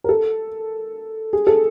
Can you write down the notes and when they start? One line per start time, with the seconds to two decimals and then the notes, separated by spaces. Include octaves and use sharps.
0.04 A#4
0.09 A4
1.33 G#4
1.47 A4